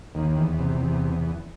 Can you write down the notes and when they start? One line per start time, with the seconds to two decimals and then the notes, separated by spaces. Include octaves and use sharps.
0.15 D#2
0.37 E2
0.59 C3
0.81 E2